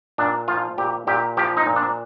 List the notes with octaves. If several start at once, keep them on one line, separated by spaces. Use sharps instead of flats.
A#2 D4
F3 F4
A#2 G4
A#2 G4
F3 G4
D#4
A#2
D4